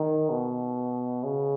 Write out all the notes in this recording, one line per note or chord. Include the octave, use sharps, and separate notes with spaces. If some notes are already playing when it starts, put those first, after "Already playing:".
Already playing: D#3
B2
C#3